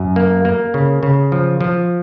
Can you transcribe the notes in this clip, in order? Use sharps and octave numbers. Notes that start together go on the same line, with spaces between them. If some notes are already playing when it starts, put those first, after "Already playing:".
Already playing: F#2
A#3
A#3
C#3
C#3
F3
F3